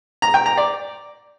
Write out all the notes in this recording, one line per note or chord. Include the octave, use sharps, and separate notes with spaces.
A#5
G5
A#5
D5